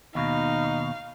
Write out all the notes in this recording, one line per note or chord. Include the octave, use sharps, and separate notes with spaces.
D#2 B2 D#4 F5